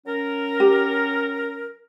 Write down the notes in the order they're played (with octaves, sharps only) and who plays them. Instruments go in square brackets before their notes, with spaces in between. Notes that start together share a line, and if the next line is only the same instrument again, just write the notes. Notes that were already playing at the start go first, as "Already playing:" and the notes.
[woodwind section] F#3 C#4 A#4
[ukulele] G4